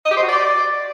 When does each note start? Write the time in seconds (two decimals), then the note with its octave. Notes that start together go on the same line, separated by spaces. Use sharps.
0.05 D#5
0.11 G4
0.17 C5
0.23 F#4
0.29 D5